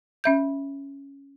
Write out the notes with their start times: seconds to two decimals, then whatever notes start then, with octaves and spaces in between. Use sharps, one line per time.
0.24 C#4 E5 G6